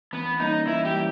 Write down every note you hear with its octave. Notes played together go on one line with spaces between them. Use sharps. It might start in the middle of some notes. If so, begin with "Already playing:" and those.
E3 B3
G3 A#3 C#4 D#4
E3 E4
G4
G3 A#3 C#4